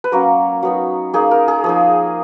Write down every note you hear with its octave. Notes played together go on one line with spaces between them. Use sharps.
B4
F#3 A#3 C#4 A#4
F#3 B3 D#4
A#3 D#4 G#4
A#4
G#4
F3 A#3 D#4 G#4